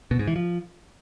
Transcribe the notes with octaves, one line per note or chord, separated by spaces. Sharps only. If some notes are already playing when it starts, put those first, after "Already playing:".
B2
G#2
E3
F3